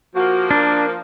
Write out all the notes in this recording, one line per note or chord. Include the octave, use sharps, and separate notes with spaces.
F3 A#3 F#4
D4 A#4